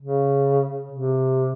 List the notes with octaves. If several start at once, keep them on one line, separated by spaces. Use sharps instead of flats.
C#3
C3